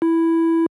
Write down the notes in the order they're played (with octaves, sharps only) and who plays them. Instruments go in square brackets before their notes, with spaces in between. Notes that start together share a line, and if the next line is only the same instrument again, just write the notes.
[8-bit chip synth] E4